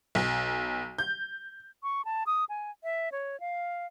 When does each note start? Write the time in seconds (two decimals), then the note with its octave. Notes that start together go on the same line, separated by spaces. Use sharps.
0.15 B1
0.98 G6
1.83 C#6
2.05 A5
2.27 D#6
2.49 G#5
2.84 E5
3.12 C#5
3.40 F5